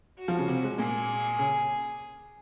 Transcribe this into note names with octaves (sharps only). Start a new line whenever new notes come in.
F#4
F3 F4
C#3 C#4
C3 C4
G#3
A#2 A#3 G#4
C#3 C#4